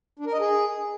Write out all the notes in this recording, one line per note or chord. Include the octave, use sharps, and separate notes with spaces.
D4
A#4
D#5
G#4